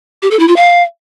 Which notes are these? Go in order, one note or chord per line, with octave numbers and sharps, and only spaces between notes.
G4
A4
E4
F4
F5